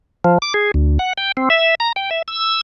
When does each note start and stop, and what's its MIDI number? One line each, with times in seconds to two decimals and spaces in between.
0.24 0.38 53
0.42 0.53 86
0.54 0.71 68
0.74 0.98 38
0.99 1.13 78
1.18 1.32 79
1.37 1.49 60
1.50 1.75 76
1.80 1.92 82
1.96 2.10 79
2.11 2.22 76
2.28 2.61 88